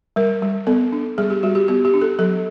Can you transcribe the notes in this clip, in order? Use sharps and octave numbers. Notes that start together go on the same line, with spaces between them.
G3 A#4
G3
B3 A4
D4
G3 G#4
G4
G3 F#4
G4
B3 G4
G4
D4
A4
F#3 A4